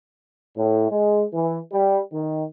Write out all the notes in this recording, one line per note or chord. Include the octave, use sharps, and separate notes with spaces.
A2
G#3
E3
G3
D#3